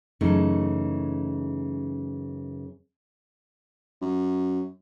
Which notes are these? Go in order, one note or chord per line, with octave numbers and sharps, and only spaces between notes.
F#2 C#3 E3 A3 D#4
F#2